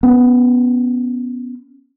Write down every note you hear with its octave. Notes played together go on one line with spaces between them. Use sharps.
B3 C#4